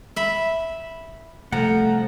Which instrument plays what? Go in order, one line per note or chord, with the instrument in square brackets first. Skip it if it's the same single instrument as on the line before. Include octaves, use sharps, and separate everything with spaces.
[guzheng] E5 B5
[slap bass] C3 G3 [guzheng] F3 [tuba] A3 [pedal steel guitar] F#5 A#5